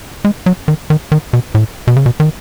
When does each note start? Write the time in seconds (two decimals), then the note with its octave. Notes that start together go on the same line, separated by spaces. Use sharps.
0.25 G#3
0.46 F#3
0.68 D#3
0.90 D#3
1.12 D#3
1.33 B2
1.55 A2
1.87 B2
1.96 C#3
2.06 B2
2.20 D#3